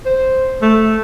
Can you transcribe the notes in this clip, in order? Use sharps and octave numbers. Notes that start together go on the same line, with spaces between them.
C5
A3